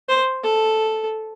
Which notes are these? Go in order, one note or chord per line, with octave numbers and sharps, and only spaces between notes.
C5
A4